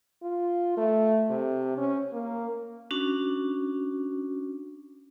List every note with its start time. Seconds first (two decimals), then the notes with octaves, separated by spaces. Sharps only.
0.23 F4
0.77 A3
1.30 C3
1.78 C#4
2.13 A#3
2.91 C#4 D4 F#4